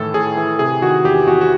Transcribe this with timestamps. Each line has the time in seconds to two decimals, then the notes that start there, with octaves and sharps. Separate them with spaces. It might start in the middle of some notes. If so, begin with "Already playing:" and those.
Already playing: A2 D#3 E3 A4
0.14 A2 G#4
0.37 E3
0.59 C3 G#4
0.82 D#3 F#4
1.05 E2 G4
1.27 E2 F#4
1.41 F#4